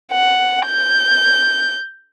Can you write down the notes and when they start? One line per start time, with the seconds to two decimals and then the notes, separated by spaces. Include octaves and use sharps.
0.12 F#5
0.67 G6